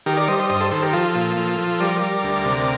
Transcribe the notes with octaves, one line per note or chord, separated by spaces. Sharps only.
D#3 G4 A#4
A#4 D5
G3 C5 D#5
C5 D#5
G2 C5 D#5
A4 C5
D#3 A4 C5
G4 A#4
F3 F4 A4
A#2
F3
F3
G3 A#4 D5
G3
D2
C3